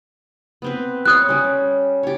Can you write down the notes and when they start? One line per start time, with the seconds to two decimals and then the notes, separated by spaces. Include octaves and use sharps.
0.62 B3 C4 B4
1.06 G3 C5 C#5 D#6 F#6
1.29 G3 C#4
2.03 G4 C#5